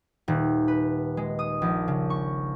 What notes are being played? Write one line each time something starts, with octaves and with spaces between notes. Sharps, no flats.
D#1
B4
G#3
D#6
A#1
C#3
C#6